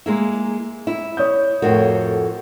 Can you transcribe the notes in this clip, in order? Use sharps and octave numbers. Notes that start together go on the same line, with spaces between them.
G#3 A#3 E4
E4
C#5 D#6 G6
F2 A2 F#4 A#4 C#5 F#5